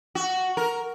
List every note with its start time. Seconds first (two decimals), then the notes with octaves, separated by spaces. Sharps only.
0.15 F#4
0.57 A#4